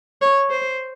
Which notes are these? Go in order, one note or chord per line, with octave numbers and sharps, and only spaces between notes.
C#5
C5